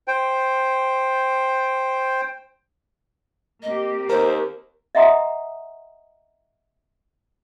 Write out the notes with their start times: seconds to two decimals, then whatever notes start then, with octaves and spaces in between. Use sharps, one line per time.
0.08 C5 G5
3.62 A#3 C4 G4 D#5
4.09 D#2 A#4 C5
4.95 D#5 E5 F#5 A#5 C6 D#6